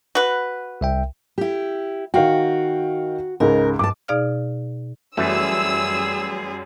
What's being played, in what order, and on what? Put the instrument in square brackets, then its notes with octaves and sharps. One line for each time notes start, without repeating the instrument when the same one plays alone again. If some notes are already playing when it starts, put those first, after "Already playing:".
[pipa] F#4 B4
[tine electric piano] C2 E5 G5
[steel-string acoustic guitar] E4 G4
[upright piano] D#3 F5 G5 [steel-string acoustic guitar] F#4
[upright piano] C#2 G#2 C#3 [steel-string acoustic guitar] A#4
[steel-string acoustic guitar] G2 A5 [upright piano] D6
[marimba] B2 D#4 G#4 D5 F5 F6
[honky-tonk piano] F#2 [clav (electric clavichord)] E3 A3 [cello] G3 G#4 [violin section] E6